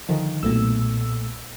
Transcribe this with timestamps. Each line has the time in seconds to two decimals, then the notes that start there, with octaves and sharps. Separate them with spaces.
0.09 D3 D#3 F3
0.43 B1 A#2 A3 E6